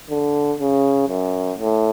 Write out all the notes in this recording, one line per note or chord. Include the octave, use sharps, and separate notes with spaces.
D3
C#3
F#2
A2